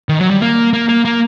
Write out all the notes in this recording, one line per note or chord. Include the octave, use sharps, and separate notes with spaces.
D#3
F#3
G3
A#3
A#3
A#3
A#3